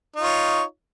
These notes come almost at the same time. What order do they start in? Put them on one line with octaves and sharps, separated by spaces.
D#4 F4 C#5